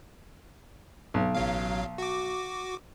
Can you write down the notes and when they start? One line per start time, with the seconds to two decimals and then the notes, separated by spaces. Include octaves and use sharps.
1.14 B1
1.35 A1 F#3 F5
1.98 F#4 D6